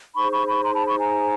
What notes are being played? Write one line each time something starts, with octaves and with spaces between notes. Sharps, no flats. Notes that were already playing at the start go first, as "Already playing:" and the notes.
D#4 G#4 C5 B5 C#6
B5 C#6
B5 C#6
A#5 C6
A5 B5
B5 C#6
G#5 A#5